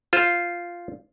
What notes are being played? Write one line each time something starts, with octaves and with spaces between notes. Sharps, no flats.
F4 C5